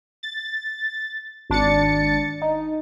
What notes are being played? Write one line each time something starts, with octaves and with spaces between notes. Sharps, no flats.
A6
G#1 D4 A6 C#7
D#4